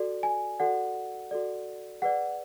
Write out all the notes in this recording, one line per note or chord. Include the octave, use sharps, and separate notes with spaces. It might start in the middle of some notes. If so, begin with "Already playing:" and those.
Already playing: F#4 A4 D5
G#5
F#4 A4 D5 F#5
F#4 A4 D5
G#4 B4 D5 F#5